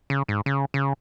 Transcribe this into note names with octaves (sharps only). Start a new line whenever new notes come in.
C#3
G#2
C#3
C#3